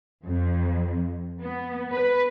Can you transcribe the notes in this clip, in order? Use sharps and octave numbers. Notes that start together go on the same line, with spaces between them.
F2
B3
B4